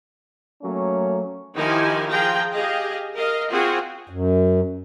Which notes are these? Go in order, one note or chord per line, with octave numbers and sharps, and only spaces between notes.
F#3 A3 A#3 C#4
D#3 F3 D#4 E4 G4 G#5
F3 G#4 F5 G5 A#5
G4 G#4 D#5 F5
A#4 D#5 F5
C4 F4 F#4 G#4
F#2